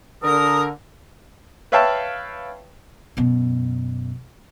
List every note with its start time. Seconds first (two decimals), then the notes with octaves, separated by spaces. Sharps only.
0.23 D3 A#4 D#6
1.72 B4 C#5 E5 F5 G5 A5
3.17 F#2 B2